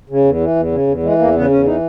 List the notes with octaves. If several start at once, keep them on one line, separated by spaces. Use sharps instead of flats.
C#3
E2
E3
E2
C#3
E2
E3 G#3
E2 A#3
C#3 B3
E2 C#4
E3 D#4